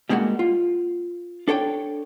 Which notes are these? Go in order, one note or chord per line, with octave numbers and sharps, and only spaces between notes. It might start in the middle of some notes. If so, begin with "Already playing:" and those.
G3 G#3 A#3 C#4 F#4
F4
D4 A4 C#5 G5